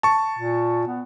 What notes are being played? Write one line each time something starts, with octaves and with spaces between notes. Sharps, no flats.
A5 C#6
A#2
B3